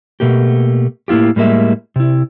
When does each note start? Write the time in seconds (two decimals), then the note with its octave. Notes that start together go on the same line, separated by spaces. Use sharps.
0.20 B2 A3 A#3 G4
1.08 A2 A#3 E4 F4 G4
1.36 A2 G3 G#3 A#3 E5
1.96 C3 E4